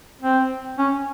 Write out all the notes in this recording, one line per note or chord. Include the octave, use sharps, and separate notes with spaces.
C4
C#4